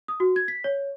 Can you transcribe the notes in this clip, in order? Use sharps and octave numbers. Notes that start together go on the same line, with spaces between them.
D#6
F#4
G#6
B6
C#5